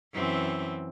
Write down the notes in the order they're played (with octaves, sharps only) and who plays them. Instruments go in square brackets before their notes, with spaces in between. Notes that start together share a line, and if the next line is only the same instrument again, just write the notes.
[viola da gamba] F#2 E3 C4